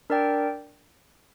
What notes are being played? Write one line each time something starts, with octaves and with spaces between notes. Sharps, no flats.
D4 A#4 D5 G5